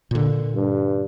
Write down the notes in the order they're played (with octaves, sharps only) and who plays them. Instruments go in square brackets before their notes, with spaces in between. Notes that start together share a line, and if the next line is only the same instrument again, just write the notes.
[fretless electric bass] A#2 D3
[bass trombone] G2